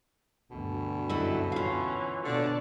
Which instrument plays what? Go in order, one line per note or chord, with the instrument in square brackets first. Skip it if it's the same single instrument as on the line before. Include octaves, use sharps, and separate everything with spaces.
[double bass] D2 G2 [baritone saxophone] B2
[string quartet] F#2 F#3 [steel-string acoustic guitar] E4 A4 D#5
[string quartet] E3 C#4 [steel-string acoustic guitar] F4 F5
[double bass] B2 [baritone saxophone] D3 [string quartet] C#5 D5 A5